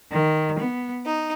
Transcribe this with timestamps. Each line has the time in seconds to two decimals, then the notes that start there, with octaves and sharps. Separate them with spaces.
0.12 D#3
0.59 B3
1.05 D#4